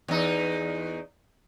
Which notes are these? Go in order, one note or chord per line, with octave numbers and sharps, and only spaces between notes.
E2 D#4